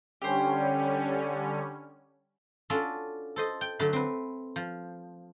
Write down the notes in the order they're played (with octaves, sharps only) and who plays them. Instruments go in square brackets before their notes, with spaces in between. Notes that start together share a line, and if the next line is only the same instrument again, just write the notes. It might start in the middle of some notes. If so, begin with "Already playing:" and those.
[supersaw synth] D3 G3 C#4 [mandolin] G4 C5
[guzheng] C#4 D4 F4 F#4 A4
A4 C5 D#5
G5
D3 F#3 A3 B5
C4 B4
F3